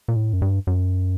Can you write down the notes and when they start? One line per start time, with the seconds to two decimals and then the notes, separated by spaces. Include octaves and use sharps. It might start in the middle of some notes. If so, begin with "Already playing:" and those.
0.08 A#2
0.16 A2
0.33 F#2
0.42 G2
0.67 F#2